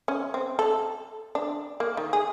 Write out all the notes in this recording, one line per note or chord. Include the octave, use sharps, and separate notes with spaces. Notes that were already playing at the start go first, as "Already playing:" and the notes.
C#4
C4
A4
D4
A#3
D#3
G#4